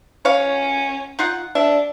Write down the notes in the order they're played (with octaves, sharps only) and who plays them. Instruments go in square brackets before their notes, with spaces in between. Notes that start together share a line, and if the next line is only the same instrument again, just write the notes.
[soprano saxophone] C#4 [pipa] C#5 F5
[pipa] D#4 F4 F#5
[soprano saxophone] D4 [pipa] E5